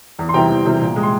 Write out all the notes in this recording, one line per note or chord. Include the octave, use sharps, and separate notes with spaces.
E2
C6
C3 E3 G3 G5 A#5
E2
C3 E3 G3
A#2
G#3
C6